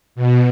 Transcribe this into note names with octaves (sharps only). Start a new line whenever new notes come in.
B2